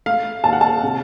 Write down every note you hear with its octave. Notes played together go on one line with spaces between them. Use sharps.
A3 F5
D#2 A5
F#5
A5
C3